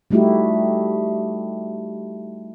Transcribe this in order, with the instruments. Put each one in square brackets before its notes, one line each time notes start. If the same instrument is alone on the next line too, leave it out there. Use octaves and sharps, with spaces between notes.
[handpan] G3 A3 D#4 E4 F#4 G4